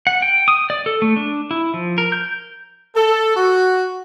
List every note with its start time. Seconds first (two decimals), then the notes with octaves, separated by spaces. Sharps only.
0.07 F#5
0.22 G5
0.48 D#6
0.70 D5
0.86 A4
1.02 A3
1.17 D4
1.51 E4
1.74 F3
1.98 A#4
2.12 G6
2.96 A4
3.37 F#4